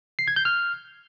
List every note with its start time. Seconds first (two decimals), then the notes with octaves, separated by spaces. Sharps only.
0.19 C7
0.28 G#6
0.36 G6
0.45 F6